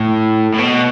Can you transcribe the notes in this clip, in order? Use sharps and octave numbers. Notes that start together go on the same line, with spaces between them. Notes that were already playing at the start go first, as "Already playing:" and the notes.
Already playing: A2
A2
B2